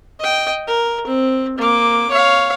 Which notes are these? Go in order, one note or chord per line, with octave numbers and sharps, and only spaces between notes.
D#5 G5
A#4
C4
A#3 D6
C#5 F5